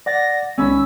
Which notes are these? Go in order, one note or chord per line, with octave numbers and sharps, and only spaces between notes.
D5 F#5 A6 A#6
C2 D#3 G#3 C#4 B5 E6